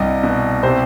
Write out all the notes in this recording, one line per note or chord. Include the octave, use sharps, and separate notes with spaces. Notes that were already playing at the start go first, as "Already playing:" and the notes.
Already playing: C2 G2 D#5
B2
C3 C5